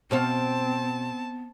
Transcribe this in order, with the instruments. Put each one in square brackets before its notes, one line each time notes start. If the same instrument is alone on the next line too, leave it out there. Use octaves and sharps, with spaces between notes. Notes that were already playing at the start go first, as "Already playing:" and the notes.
[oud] B2 C5 F5 [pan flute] B3 [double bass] C4 [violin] A5